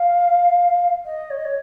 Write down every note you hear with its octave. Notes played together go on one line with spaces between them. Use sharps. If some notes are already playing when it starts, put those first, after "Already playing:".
Already playing: F5
D#5
C#5
D#5
C#5